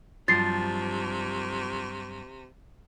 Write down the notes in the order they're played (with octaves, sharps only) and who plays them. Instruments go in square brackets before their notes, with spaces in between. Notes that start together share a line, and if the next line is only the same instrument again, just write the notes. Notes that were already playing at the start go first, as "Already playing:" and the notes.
[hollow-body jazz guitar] G2 F#3 [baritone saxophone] C3 [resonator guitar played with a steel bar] F3 [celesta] A6 C7